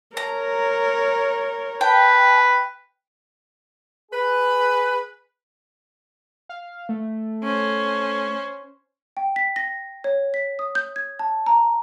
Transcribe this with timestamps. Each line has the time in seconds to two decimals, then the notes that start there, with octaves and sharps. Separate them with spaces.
0.17 A#4 C#5 A#5
1.81 B4 G5 A5
4.12 G#4 B4
6.49 F5
6.89 A3
7.43 C#4 C5
9.17 G5
9.36 B6
9.56 A#6
10.04 C#5
10.34 B6
10.59 D#6
10.75 G6
10.96 G#6
11.19 A5
11.46 A#5